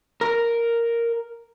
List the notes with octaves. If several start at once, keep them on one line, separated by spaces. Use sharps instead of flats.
A#4